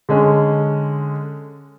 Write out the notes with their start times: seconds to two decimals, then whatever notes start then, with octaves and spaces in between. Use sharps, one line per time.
0.09 D3 G#3 C#4